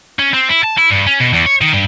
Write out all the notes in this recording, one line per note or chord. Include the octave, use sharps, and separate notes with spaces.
C#4
C4
E4
A5
E4
G2
C#4
B2
E2
C#5
D#3
G2